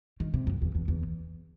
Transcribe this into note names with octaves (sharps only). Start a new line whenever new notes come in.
D#3
C3
F#2
E2
E2
E2